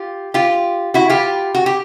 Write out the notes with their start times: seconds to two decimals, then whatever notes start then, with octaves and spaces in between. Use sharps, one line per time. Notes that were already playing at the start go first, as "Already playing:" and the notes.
Already playing: F4 G4
0.34 F4 G4
0.94 E4 F#4
1.09 F4 G4
1.55 F#4
1.66 G4